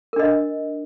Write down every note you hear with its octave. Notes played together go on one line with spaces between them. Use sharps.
D4 A#4 D#5